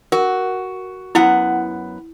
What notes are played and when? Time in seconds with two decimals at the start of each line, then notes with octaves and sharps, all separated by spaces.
0.12 F#4 A#4
1.15 F#2 B3 E4 F#5